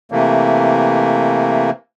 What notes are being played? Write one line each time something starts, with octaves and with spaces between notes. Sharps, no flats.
C3 E3 A3 A#3